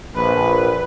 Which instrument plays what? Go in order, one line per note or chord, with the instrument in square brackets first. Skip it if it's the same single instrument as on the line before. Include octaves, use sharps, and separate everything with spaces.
[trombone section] A#1 [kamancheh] B4